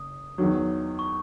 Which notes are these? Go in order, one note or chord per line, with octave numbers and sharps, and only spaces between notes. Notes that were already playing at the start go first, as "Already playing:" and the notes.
Already playing: F#1 D#6
E2 D#3 F#3
C#6